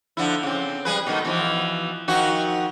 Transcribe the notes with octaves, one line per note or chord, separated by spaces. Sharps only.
D3 F3 E4
C#3 C4
G3 G#4 B4
B2 D#3 A3
B2 E3 F3
D#3 F3 F#4